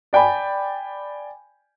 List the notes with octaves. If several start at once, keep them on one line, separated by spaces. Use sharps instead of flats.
D5 G5 G#5 B5